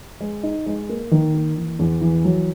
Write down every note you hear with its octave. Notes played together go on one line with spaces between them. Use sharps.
G#3
D#4
G#3
A#3
D#3
A#3
E3
E2
E3
F#3